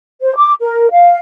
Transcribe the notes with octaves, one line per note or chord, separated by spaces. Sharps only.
C5
D6
A#4
F5